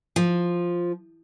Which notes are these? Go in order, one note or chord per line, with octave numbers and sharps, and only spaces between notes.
F3